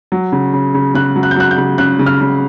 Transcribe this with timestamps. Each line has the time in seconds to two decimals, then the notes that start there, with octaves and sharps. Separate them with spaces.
0.12 F#3
0.32 C#3
0.53 C#3
0.74 C#3
0.95 C#3 F#6
1.16 F#3
1.23 F#6
1.31 G6
1.36 F#3 F#6
1.51 G6
1.58 C#3
1.78 C#3 F#6
1.99 C#3
2.06 F6
2.21 C#3